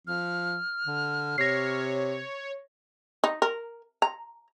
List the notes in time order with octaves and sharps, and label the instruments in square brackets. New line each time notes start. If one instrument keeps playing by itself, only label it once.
[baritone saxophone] F3 [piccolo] F6
[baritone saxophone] D3
[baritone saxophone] C3 [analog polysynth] C#5 [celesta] A#6 C7
[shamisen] D#4
A#4
A#5